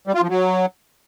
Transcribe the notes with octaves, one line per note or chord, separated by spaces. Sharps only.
G3
F4
F3
F#3